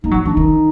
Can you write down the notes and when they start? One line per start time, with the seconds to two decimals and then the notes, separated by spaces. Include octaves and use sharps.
0.04 A#3 D#4
0.11 F#3
0.14 F3
0.25 E3 D4
0.33 D#3 D#4